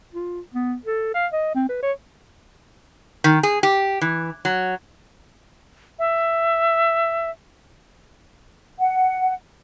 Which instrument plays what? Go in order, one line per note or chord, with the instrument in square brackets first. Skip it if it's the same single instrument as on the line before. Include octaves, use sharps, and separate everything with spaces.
[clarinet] F4
B3
A4
F5
D#5
C4
B4
C#5
[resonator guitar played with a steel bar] D#3
G#4
G4
E3
F#3
[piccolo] E5
[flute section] F#5